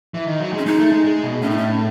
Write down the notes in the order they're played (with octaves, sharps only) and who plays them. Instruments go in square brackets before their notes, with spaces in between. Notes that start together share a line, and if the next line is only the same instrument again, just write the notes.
[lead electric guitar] E3
D#3
F#3
G#3
[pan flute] C#4
[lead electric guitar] G#3 [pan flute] D#4
[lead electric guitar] A3
G#3
G#3
B2
[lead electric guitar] A2 [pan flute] C#4
[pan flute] D#4
C#4